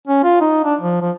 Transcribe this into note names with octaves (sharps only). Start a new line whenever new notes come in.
C#4
F4
D#4
D4
F3
F3